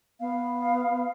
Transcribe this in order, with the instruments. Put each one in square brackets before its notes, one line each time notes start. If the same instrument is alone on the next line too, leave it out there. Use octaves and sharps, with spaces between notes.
[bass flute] B3 [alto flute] F5